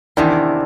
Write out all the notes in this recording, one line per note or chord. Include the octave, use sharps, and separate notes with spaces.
E2 C3 D#3 D4 E4